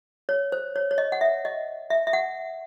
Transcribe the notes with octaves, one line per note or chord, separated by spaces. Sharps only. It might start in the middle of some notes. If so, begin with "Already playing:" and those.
C#5
C5
C#5
C#5
D#5
F#5
E5
D#5
E5
E5
F#5